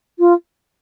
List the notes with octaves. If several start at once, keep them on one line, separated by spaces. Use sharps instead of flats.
F4